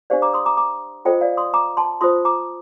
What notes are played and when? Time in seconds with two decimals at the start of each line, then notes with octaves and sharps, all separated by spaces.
0.10 D4 G4 C5 D5 F5
0.22 A#5 D6
0.34 C6 D#6
0.46 A#5 D6
0.57 A#5 D6
1.05 F4 A4 C5 D#5 G5
1.21 D5 F5
1.37 C6 D#6
1.54 A#5 D6
1.77 A5 C6
2.01 F4 C5 C6 D#6
2.25 A#5 D6